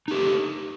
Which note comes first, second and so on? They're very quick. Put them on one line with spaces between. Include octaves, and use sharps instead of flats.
D#4 G4 A3